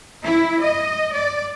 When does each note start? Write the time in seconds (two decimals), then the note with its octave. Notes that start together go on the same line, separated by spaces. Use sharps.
0.24 E4
0.62 D#5
1.14 D5